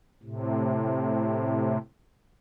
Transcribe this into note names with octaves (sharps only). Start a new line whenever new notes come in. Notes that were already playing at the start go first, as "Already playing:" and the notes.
A2 C3